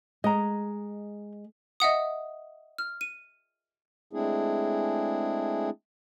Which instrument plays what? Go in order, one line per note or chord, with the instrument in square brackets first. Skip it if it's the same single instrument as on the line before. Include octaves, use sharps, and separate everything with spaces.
[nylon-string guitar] G#3 [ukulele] D#5 A#5
[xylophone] D#5 E5 F#5 D#6
F6
D#7
[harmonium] G#3 A3 C4 D4 E4 G#4